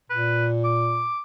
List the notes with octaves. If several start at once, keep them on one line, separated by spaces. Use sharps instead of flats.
A#2 B4
D6